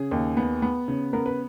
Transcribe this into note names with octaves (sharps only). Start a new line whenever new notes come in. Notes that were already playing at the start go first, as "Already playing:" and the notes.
Already playing: C#3 G#4
D#2
B3
B3
C#3
B3 A#4
B4